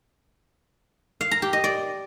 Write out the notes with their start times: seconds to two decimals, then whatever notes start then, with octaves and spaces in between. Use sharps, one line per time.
1.21 F5
1.31 A#5
1.42 G4
1.53 D#5
1.64 D5